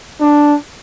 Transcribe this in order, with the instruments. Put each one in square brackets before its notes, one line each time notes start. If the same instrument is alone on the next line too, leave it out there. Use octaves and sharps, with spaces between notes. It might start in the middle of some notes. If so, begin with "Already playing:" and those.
[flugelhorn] D4